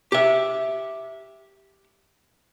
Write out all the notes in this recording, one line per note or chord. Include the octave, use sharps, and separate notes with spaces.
G4 E5